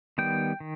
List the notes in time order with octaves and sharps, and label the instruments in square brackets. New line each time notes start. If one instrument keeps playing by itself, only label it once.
[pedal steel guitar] D#3 G3 B3 G5
D#3